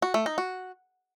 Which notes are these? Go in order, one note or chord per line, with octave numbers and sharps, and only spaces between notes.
F#4
A3
D#4
F#4